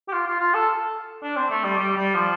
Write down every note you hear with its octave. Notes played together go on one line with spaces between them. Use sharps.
G4
F4
F4
F4
A4
D4
C4
A3
G3
G3
G3
F3